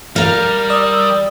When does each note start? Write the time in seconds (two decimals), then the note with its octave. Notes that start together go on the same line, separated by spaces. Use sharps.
0.16 G3 A#4 F5
0.70 D5 D#6 E6